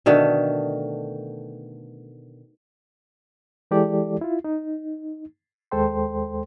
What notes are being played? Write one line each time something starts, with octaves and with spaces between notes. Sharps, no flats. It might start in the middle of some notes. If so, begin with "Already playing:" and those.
B2 D3 D#3 A3
E3 G#3 E4 G4 A4 D5
E4 F4
D#4
D#2 G#3 A4 C5 G5 C6